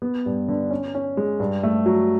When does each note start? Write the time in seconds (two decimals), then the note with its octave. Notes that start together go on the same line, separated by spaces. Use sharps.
0.02 B3
0.26 G2
0.48 D3
0.71 C#4
0.95 C#4
1.17 G#3
1.40 G2
1.63 A3
1.86 F#3